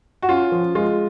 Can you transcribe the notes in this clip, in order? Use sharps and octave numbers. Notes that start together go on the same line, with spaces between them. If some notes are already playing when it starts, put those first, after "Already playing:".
F#4
C#4 F4
F3
G#3 F4